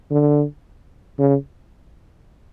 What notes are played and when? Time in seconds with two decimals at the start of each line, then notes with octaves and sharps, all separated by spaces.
0.11 D3
1.19 C#3